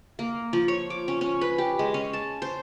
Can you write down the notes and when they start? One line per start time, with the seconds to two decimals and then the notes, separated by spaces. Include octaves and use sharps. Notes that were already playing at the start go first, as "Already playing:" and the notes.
0.19 A#3
0.53 F3
0.68 C#5
0.90 D6
1.08 C#4
1.21 C#4
1.41 B4
1.58 G4
1.79 G#3
1.94 C#4
2.13 A5
2.42 C5